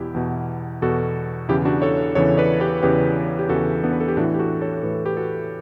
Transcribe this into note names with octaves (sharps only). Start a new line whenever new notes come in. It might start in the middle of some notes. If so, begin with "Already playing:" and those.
Already playing: E2 B2 B3 E4 G4
E2 B2
E2 B2 F#4 A4
E2 C#3 E3 E4 G4
D4 F#4
A4 C#5
E2 C#3 E3 A4 C#5
B4 D5
G4 B4
E2 C#3 E3 G4 B4
G4
E2 C#3 E3 F#4 A4
B3 D4
B4
A4
G4
A2 E3 D4 F#4
G4
F#4 A4
A4 C#5
A2 E3 B4
A4
G4 B4
F#4 A4